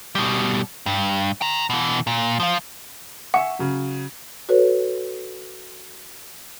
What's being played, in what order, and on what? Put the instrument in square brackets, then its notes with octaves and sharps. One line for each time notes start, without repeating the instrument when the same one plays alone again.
[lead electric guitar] B2 G3
G2
G5 A#5
B2 E3
A#2
F3 F4
[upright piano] E5 G#5 C#6 [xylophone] F#5
[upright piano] C#3 F#3
[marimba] F#4 A4 B4 C#5